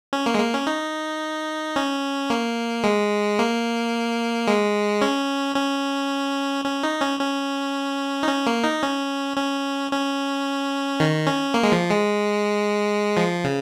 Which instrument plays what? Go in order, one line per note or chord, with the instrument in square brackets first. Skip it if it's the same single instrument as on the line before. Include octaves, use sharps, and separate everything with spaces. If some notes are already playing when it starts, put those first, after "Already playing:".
[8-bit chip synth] C#4
A#3
G#3
A#3
C#4
D#4
C#4
A#3
G#3
A#3
G#3
C#4
C#4
C#4
D#4
C#4
C#4
D#4
C#4
A#3
D#4
C#4
C#4
C#4
D#3
C#4
A#3
G#3
F3
G#3
F3
C#3